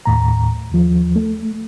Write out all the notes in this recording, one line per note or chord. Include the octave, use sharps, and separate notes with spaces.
D#2 A2 A#5
D#2 F3
A3